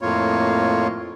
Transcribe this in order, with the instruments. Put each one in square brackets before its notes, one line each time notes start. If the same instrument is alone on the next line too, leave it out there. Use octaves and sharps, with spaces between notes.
[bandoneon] F2 A2 A#3 F4 C#5